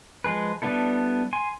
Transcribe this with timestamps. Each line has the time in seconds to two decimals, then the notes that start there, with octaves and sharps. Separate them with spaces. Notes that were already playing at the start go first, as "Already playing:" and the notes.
0.24 F3 G#3 G#4 B4
0.62 G3 B3 D4 E4 A4
1.33 G#5 C6